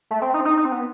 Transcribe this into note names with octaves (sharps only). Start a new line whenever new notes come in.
A3
C4
D#4
C4
D#4
D#4
C4
B3